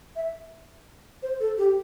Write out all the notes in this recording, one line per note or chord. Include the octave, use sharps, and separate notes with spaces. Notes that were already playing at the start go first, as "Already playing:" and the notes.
E5
C5
A4
G4